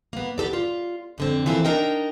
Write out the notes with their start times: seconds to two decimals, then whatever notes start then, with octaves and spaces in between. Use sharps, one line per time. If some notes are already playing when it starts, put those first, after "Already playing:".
0.13 A#3 B3
0.38 B3 G4 A4 D5
0.53 F4
1.18 F2 D3 C4
1.46 E3 F3 A#3 C4 A4
1.65 D4 D#4 A#4 D#5 G5